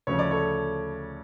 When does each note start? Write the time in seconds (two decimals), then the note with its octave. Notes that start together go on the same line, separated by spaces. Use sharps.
0.07 D2 C#3 F3 C#5
0.19 D5
0.31 A4 C#5